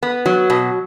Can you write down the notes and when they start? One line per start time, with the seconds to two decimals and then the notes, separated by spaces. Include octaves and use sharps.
0.03 B3
0.26 F#3
0.50 B2